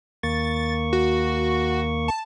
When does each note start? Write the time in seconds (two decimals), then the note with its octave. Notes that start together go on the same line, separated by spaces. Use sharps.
0.23 D#2 A#3 C#6 A6
0.93 F#4
2.08 A5